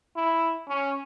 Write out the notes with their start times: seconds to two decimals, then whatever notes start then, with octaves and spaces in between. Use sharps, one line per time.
0.16 E4
0.68 C#4